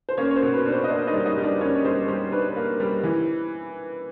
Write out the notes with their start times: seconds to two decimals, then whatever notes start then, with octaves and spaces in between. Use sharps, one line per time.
0.09 C5
0.17 A#3 C#4 C#5
0.31 C#5
0.36 C5
0.42 B2
0.53 B4
0.66 D4
0.72 C5
0.84 D#5
0.89 A#3 D4 D5
1.07 D#4 D#5
1.13 G3
1.25 D#4 D#5
1.37 G3
1.43 D4 D5
1.60 A#3 C#4 C#5
1.85 G3 C5
2.08 G3 C5
2.32 D4 B4
2.56 A#3
2.80 G3
3.03 E3